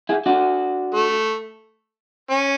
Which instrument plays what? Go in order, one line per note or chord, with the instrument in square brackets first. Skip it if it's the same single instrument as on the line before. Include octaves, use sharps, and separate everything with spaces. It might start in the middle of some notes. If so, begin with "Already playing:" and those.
[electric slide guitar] E4 G#4
D4 F#4
[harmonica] A3
C#4